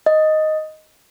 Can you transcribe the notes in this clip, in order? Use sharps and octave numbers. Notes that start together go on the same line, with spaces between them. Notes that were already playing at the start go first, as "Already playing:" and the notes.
D#5